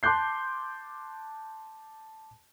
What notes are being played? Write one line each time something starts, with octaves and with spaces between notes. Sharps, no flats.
A5 C6 D6 F#6 G6 C7